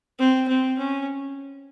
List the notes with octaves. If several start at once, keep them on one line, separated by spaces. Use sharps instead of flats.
C4
C4
C#4